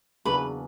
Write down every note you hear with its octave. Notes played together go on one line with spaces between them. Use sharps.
E2 C#3 F#3 A#3 D4 B4